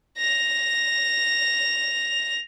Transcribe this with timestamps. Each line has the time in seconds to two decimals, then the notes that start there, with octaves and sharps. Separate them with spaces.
0.18 A#6 F7